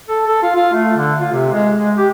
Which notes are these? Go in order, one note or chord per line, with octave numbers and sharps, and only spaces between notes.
A4
A4
F4
F4
A3
D3
F4
C3
G#3
G#3
G4